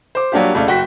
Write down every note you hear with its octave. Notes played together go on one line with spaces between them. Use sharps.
C5 D6
F#3 G3 A#3 D4 F4 G4
F2 C#3 A3 D5 F5
F#1 F#4 G5 B6